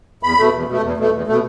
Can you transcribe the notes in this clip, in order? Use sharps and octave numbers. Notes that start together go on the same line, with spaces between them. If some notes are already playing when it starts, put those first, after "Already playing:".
E2 B5
B2 A3
E2
B2 A3
E2
B2 A3
E2
B2 A3